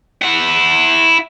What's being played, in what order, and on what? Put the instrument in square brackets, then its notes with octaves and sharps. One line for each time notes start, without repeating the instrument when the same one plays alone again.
[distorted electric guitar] E4 F#5